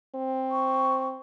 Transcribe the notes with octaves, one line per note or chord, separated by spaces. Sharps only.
C4
C#6